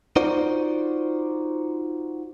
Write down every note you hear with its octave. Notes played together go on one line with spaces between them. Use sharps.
D#4 F4 F#4 C5 D5